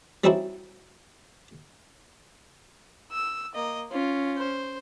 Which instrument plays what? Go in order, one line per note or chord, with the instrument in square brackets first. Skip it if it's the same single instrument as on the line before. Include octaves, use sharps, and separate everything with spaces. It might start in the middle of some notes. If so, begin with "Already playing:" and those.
[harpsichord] G3 C4 C#4 D#4 E4 F#4
[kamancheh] E6
A#3 D#5
[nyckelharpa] C#4 [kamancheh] F4
[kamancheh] C5